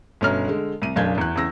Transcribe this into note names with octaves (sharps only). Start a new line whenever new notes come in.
G1 B2 C#4 A#5 F6
D3 G#3
C2 D#7
F#1 B1 D4 F5 G6 G#6
E2 F#6
E2 C#3 E6 A#6